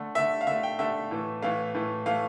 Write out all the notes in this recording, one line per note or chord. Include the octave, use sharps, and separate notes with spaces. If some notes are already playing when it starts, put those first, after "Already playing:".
Already playing: D3 A3
D3 A3 E5
F5
D3 A3 E5
G5
D3 A3 E5
A2 E3 A3
A2 E3 A3 F5
A2 E3 A3
A2 E3 A3 F5